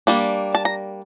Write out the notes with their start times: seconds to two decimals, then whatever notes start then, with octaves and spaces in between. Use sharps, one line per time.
0.07 G3 A#3 D4
0.55 A5
0.65 A#5